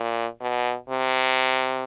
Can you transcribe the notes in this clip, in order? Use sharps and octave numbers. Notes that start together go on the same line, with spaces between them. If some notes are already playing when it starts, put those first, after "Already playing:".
Already playing: A#2
B2
C3